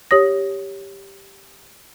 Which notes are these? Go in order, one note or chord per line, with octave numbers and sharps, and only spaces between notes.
G4 C#5 D#6 A#6